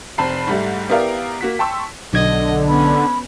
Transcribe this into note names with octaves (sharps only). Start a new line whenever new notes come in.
F1 C4 A5 B5 C7
G#2 G3 A3
B3 E4 G4 A#4 D5 F5
A#3 F#4 B6
G5 A5 C6 C#6 E6
B1 D3 D#5 G#6
B3 C#4 B5